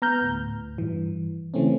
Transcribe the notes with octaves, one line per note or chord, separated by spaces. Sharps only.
B3 A#5 F6 G6
D2 A2
G2 E3
C#3 E3 A3 C4 C#4